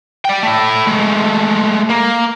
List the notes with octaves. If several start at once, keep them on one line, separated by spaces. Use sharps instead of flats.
D5 G5
A3 E4
G#3 A3
A#3